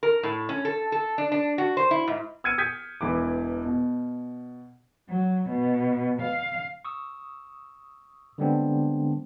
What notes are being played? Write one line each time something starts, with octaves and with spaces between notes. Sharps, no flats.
A#4
A2
C#4
A4
A4
D4
D4
F#4
C5
E4
G#2
E6 F6 G#6 C#7 D#7
D#6 G6 G#6 B6 C#7 D#7
E1 E3 D6
B2
F#3
B2
F5
C#6 D#6 E6
D3 G3 G#3 B3 C4 D4